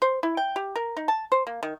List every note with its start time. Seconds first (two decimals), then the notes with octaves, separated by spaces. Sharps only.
0.02 C5
0.23 E4
0.37 G5
0.56 G4
0.76 A#4
0.97 D#4
1.08 A5
1.32 C5
1.47 A#3
1.63 D#3